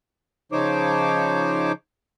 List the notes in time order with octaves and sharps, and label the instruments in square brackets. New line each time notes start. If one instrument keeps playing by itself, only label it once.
[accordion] C#3 F3 D#4 C5 C#5 D6